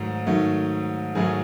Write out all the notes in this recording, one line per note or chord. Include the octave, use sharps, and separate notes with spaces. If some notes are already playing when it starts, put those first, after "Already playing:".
Already playing: G#2 D#3 F#3 A3
G#2 D#3 F#3 A3
G#2 D#3 F#3 A3 G#4